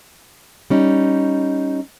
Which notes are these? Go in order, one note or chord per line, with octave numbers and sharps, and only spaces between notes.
G3 C#4 D#4